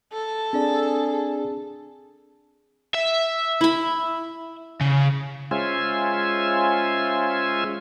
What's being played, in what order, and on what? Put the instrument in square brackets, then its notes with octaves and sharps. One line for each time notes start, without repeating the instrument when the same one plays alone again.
[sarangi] A4
[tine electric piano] C4 D4 D5 [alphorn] G#4
[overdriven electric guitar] E5
[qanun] E4 B5
[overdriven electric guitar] C#3
[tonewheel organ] G#3 C#4 F4 C5 E5 G#5